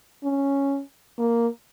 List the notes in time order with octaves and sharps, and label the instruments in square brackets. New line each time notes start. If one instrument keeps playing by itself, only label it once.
[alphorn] C#4
A#3